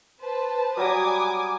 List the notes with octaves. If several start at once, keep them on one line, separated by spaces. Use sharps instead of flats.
B4 C5 A5
F#3 G3 G#5 D6 D#6